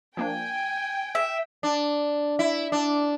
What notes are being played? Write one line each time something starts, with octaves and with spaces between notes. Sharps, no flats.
F3 A#3 D4 G5 G#5
E5
D4
E4
D4